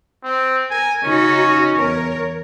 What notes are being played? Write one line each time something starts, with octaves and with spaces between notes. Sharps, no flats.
C4
A#4 G#5
C#3 C#4 D#4 F#4
E2 A#4 C#5